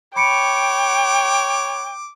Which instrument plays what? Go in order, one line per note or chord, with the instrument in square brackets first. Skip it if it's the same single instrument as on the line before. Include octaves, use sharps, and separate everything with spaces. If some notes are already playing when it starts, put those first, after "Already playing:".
[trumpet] C#5 [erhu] G5 [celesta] B5 C#7 D7 [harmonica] D6